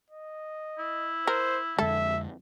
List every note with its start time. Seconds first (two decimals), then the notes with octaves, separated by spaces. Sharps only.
0.11 D#5
0.79 E4
1.27 A#4 C5
1.79 F2 D3 G#3 A4 E5